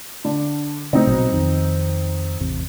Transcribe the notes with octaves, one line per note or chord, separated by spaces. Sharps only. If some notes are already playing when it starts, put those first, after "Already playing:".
D3 D4
C#3 A3 C4 D#4
A#1 B2 F#3
F2 D#3
A1 E2 C3